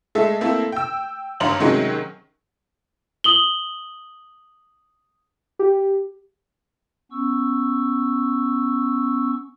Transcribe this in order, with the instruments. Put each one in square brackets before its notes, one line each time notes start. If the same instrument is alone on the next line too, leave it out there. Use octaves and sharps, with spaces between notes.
[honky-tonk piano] G#3 A3 A4 E5
A3 A#3 C4 E4 A4
G5 E6
G#1 G2 C#5 A#5 C6 F#7
C3 D#3 F#3 G#3 C#4
[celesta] D#6 F#7 G7
[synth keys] G4
[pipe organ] B3 C#4 C#6 E6